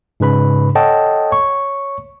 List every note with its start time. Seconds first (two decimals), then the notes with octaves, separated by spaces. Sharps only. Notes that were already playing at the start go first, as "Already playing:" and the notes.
0.20 G#2 C#3 B4 B5
0.75 A4 C#5 D#5 F#5 G5 A5
1.31 C#5 C#6